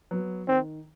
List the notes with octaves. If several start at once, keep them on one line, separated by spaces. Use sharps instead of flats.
F#3 B3
D#3 C4